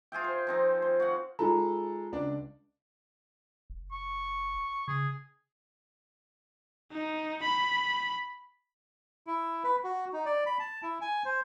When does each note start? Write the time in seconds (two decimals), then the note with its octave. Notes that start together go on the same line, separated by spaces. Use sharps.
0.12 F4 G#4 E5 G5
0.24 C5
0.47 F3 C4 D#4
0.82 C5
1.00 F#4 F5 F#5
1.39 G#3 D#4 F4 A4 A#5
2.12 C#2 D4 D5
3.70 F#1
3.92 C#6
4.88 C#3 G#4
6.92 D#4
7.43 B5
9.27 E4
9.64 B4
9.84 F#4
10.13 D#4
10.25 D5
10.46 B5
10.59 A5
10.83 E4
11.01 G#5
11.25 C5